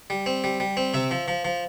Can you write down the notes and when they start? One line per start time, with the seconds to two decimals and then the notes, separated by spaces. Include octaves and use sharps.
0.10 G3
0.26 C4
0.44 G3
0.60 G3
0.77 C4
0.94 C3 E5
1.11 F3
1.28 F3
1.45 F3